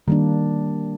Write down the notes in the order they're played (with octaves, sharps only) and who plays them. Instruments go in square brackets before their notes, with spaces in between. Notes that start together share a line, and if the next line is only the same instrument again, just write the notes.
[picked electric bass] D#3 [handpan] G3 A#3 D4